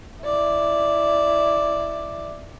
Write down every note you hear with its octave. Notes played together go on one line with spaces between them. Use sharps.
E4 D5